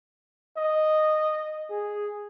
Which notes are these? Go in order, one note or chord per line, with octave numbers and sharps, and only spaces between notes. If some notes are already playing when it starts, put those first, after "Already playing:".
D#5
G#4